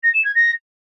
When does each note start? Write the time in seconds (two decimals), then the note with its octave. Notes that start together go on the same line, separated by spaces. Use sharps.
0.03 A#6
0.13 E7
0.24 G#6
0.35 A#6